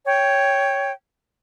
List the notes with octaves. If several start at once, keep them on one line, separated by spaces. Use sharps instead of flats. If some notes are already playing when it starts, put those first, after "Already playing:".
C#5 G5